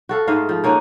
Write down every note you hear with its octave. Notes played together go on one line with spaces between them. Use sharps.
F#4 A4 F5
G#2 A3 D#5 F5
F3
A#3 C#4 D#4 F#5